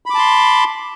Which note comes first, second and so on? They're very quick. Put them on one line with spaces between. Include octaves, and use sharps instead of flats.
B5 D6 A5 C6